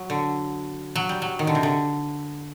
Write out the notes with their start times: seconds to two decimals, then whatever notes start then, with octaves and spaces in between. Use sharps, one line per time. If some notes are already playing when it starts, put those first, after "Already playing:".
Already playing: F#3
0.10 D3
0.96 F#3
1.09 G3
1.22 F#3
1.39 D#3
1.47 D3
1.55 C3
1.63 D3